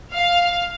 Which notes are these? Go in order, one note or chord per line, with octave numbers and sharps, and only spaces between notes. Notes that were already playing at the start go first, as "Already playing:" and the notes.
F5